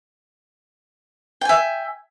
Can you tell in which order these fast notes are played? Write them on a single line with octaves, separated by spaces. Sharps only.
G5 G#5 E5